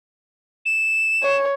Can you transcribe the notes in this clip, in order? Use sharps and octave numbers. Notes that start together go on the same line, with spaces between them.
E7
C#5